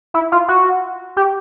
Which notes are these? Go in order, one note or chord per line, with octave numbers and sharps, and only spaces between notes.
E4
F4
F#4
G4